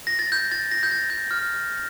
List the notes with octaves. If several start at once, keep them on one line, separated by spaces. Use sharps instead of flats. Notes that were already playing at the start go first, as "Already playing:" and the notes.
A#6
A6
G6
A6
A#6
G6
A6
G6
F6